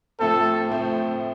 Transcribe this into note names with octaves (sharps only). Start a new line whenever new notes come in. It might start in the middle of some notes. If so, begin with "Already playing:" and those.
A2 F3 A3 C4 A4
A2 F3 A3 C4